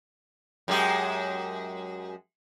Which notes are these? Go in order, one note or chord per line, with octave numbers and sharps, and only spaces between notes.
F#2 G#3 G4